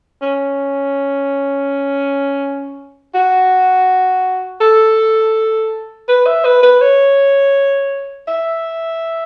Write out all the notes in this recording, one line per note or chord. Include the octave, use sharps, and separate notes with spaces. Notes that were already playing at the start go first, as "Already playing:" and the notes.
C#4
F#4
A4
B4
E5
B4
B4
C#5
E5